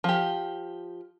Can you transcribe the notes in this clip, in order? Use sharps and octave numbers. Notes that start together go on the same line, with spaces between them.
F3 G4